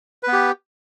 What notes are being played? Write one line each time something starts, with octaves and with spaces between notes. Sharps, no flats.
B3 G4 B4